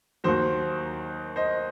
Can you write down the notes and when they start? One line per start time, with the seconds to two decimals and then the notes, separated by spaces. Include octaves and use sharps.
0.24 D#2 D#3 F#3 C5
1.36 C5 D#5